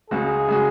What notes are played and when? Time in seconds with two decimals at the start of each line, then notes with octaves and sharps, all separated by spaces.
0.10 C#2 C#3 G#3 F#4 G#4
0.48 C#3 G#3 F#4